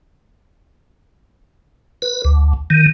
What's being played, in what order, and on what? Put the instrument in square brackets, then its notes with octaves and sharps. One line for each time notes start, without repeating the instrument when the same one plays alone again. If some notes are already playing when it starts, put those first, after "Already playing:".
[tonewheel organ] B4
D2
D#3